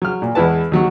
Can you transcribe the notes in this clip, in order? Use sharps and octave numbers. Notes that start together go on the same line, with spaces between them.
F#3 F6
A#2
E2 G#3 E4 B4 A5
D#2 F#3 F#4